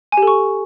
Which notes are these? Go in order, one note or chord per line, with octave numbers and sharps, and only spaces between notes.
G#5
G4
A4
C#6